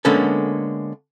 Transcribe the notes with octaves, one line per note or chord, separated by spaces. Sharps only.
D3 G#3 A#3 B3 C#4 A4